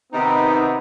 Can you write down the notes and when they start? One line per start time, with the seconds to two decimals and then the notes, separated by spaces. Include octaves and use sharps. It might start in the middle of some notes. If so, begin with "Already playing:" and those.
0.13 C3 D#3 B3 D#4